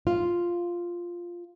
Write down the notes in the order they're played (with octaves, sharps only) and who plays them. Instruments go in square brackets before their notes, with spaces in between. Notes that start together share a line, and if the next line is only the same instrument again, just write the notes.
[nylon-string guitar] F4